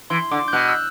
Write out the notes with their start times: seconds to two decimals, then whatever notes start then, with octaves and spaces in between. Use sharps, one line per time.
0.10 E3 C6
0.31 D3 D6
0.48 G6
0.53 B2 F#6
0.68 E6